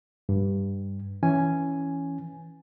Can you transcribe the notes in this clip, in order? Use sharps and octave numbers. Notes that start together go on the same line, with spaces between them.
G2
E3 C#4 G#5